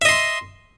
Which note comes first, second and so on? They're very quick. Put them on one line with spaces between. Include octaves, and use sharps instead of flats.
E5 D#5 C6